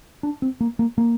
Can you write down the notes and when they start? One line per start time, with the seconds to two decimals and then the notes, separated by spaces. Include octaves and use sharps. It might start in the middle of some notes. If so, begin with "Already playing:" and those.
0.23 D4
0.42 C4
0.61 A#3
0.79 A#3
0.98 A#3